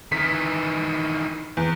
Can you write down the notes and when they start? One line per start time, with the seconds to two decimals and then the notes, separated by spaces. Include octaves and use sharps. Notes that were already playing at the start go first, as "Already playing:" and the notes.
0.12 D#3 E3 B6
1.57 E2